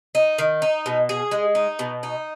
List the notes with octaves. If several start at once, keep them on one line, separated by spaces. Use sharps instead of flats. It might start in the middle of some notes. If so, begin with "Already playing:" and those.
D#4
D#3
D#4
B2
G#4
G#3
D#4
B2
D#4